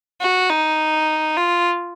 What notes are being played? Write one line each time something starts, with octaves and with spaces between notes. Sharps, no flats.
F#4
D#4
F4